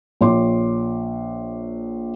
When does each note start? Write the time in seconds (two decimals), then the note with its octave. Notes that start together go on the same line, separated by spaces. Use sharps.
0.21 A#1 C#5 C6 D6